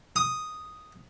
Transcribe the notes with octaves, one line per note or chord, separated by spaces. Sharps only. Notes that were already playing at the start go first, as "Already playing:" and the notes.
D#6